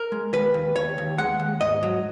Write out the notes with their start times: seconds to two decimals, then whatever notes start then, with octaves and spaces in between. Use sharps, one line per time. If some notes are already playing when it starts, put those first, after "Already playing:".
Already playing: A#4
0.12 G#3
0.33 D#2 B4
0.54 D#2
0.76 D#2 C#5
0.98 D#2
1.18 G#3 F#5
1.40 D#2
1.61 G#2 D#5
1.83 F#3